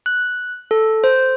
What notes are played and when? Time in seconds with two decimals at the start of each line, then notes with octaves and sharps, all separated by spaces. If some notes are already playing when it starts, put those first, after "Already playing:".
0.06 F#6
0.71 A4
1.04 C5